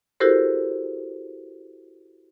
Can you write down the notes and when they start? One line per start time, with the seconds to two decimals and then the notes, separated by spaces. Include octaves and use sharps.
0.20 E4 F#4 G4 A4 A#4 C5